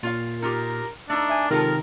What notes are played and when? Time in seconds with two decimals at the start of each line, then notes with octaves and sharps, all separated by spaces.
0.03 A#2 F4 C#5 F5
0.42 D#4 F4 G4 A#4
1.09 A3 D4 D#4
1.30 E5 G#5
1.51 C3 D#3 G#3 F4 A4 A#4